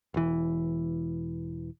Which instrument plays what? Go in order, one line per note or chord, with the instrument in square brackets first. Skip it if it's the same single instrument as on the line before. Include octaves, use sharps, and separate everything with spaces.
[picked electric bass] E1 E3